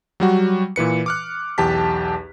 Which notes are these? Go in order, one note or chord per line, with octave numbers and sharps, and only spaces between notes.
F#3 G3 F#4
A#2 E3 B4 C#7
D6 F6 F#6
B1 E2 G4 A5 B6